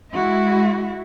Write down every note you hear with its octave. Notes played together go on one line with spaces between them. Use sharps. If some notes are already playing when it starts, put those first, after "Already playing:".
G#3 E4 F#4